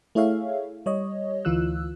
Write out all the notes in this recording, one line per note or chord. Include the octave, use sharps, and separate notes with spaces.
A3 E4 G#4 C#5 E5 F5
G3 C#5 D#5
D2 E3 F4 E6 F#6